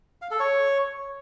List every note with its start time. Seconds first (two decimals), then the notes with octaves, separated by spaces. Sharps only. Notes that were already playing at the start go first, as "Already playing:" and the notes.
0.22 F5
0.31 A4
0.40 C#5